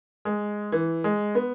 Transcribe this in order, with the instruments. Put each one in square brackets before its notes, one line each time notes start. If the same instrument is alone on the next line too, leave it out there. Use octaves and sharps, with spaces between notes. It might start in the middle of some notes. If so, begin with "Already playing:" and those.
[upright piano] G#3
E3
G#3
B3